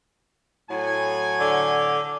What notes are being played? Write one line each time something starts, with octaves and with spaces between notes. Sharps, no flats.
A2 F#3 G#5
D3